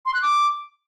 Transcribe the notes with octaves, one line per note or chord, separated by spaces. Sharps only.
C6
F#6
D6